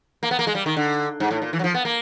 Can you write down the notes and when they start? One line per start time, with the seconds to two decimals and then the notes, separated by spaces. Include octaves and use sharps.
0.23 A#3
0.31 B3
0.39 A#3
0.47 G#3
0.55 G3
0.66 D#3
0.77 D3
1.20 G#2
1.31 A2
1.42 A#2
1.53 E3
1.59 F#3
1.64 F3
1.74 B3
1.85 A#3